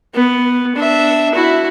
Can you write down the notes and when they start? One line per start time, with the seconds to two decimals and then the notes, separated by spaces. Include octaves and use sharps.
0.14 B3
0.75 D4 E5
1.35 E4 F#4